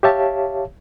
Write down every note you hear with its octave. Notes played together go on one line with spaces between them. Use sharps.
G4 C#5 E5 F5 A5